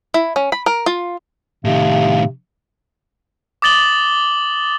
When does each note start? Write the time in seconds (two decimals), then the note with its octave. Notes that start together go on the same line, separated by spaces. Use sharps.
0.14 E4
0.36 C#4
0.52 B5
0.66 A#4
0.86 F4
1.65 A2 C3 D#3 F5
3.62 D6 D#6 A6 F#7 G7